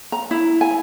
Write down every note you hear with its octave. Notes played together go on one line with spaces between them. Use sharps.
A#5
E4
G#5